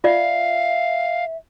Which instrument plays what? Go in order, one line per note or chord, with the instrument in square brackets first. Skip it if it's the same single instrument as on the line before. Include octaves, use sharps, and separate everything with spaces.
[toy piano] F4 D5 [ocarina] E5 [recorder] F5